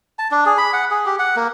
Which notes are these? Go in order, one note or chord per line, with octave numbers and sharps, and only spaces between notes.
A5
D4
G#4
B5
F#5
G#4
G4
F#5
A#3